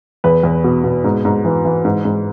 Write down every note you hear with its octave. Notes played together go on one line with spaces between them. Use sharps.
E2 B4
E2
B2
B2
G#2
G#2
E3
E3
G#2
G#2